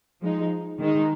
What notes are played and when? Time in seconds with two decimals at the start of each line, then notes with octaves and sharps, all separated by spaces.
0.22 F3 G#3 D#4
0.79 D#3 G#3 D#4